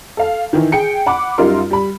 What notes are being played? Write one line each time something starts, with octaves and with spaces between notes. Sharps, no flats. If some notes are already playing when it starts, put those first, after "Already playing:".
A4 F5
D#3 E3
G#4 G5 C#7
F#5 B5 D6
F#2 G3 D#4 F4 A#4 C6
G3 B5